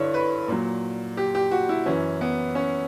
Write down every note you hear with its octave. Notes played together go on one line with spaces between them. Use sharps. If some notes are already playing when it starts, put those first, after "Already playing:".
Already playing: G2 D3 E4 C#5
B4
A#2 F#3
G4
G4
F#4
E4
F#2 E3 C#4
B3
C#4